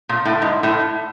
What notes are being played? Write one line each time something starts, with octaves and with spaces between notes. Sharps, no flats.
A#2
A2
G#2
A2